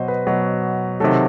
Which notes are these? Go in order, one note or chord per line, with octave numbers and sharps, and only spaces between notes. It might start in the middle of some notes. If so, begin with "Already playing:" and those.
Already playing: B2 F#3 C5 D#5
B4
B2 F#3
C3 D#3 F#3 A4